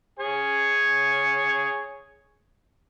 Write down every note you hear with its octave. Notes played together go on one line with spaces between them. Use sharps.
G#4 C#5 G#5